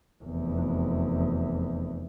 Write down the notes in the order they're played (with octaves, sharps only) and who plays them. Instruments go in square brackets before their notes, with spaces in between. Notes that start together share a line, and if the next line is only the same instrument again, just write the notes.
[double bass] F1 E2